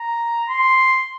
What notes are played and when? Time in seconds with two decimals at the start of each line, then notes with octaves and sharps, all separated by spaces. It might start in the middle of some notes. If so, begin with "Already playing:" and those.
Already playing: A#5
0.49 C6